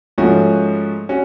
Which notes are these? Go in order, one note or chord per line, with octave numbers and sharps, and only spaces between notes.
G#2 F3 A3 C#4 F#4
C#4 F#4